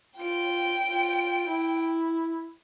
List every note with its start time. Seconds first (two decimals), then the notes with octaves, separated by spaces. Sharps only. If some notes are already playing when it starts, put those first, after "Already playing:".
0.18 F4 G5 D7
0.87 F4
1.47 E4